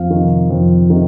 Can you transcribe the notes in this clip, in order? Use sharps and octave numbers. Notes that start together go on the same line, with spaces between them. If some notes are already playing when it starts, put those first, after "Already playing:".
Already playing: F2 F5
C3 D#3
F2
C3 D#3